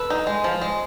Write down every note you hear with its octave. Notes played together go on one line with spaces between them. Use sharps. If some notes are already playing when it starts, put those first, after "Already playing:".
Already playing: A4 B4
D#4
G#3
F3
G#3